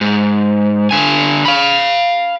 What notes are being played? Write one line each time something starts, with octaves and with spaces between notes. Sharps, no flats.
G#2
D3 G#5
F5 B5